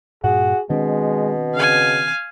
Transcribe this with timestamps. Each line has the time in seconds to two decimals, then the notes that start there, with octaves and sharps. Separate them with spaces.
0.24 G2 A#2 F#4 G#4
0.70 B2 D#3 G#3 C4 D4
1.55 C#3 F5 G#5